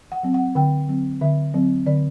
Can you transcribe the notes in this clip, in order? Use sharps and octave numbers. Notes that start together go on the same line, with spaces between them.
F#5
F#3 C4
F#5
D3 G5
F#3 C4
D3 E5
F#3 C4
D3 D5